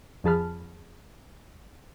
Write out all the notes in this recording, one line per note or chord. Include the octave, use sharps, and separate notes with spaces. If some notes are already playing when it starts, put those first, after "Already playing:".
F2 F3 G#4 A5 B5 F6